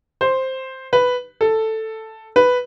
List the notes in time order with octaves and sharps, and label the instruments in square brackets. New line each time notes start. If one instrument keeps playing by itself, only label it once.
[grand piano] C5
B4
A4
B4